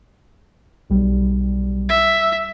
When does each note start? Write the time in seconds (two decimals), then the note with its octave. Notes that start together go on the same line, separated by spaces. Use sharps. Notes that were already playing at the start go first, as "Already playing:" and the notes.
0.90 B1 G3
1.89 E5